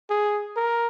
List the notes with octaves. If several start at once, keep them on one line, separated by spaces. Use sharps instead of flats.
G#4
A#4